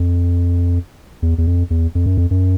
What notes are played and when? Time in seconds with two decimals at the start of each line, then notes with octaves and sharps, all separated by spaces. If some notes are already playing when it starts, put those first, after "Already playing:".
Already playing: F2
1.22 E2
1.38 E2
1.47 F2
1.70 E2
1.95 F2
2.06 F#2
2.17 F2
2.31 F#2